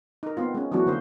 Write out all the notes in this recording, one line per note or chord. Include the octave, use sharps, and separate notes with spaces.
D#4 A#4
B3 C4 F4
G#3 C#4
E3 F#3 A3 B3 D4 F#4
D3 A#3 C5